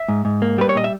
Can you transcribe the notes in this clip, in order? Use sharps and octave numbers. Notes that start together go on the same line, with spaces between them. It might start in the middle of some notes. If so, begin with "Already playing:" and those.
Already playing: E5
G#2
G#2
A#3
G3 B4
C#5
A#2 D#5
E5